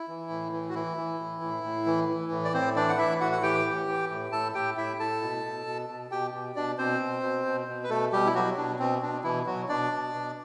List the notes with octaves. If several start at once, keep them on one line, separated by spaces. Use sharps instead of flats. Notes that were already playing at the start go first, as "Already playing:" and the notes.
Already playing: E4
E3
A2
E3
F#4
E3 E4
E3
A2
A2
A2
E3
E3
A2
D5
A2 C4 C5
E3 D4 D5
F#5
E3 E4 E5
A2 F#4 F#5
F#5
E3 G4 G5
E3
E3
A2
A2 A4 A5
A2 G4 G5
A2 E4 E5
A2 A4 A5
B2
B2
B2
B2
B2 G4 G5
B2
B2 D4 D5
B2 C4 C5
B2
B2
B2
B2
B4
B2 A3 A4
B2 G3 G4
E4
B2 F#3 F#4
B2 D4
B2 C4
B2 D4
B2 E3 E4
B2 F#3 F#4
B2 D4 D5
B2
B2